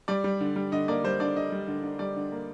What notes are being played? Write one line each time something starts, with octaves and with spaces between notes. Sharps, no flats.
G3 D5
G3
D3
G3
D3 D#5
A#3 D5
G3 C5
D3 D5
D3 D#5
G3
D3
D3
G3 D5
D3
A#3